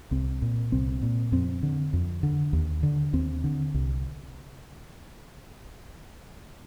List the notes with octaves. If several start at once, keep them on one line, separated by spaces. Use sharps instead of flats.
C2 C4
A#2
C2 C4
A#2
F2 C4
D3
F2
D3
D#2
D3
D#2 C4
D3
C2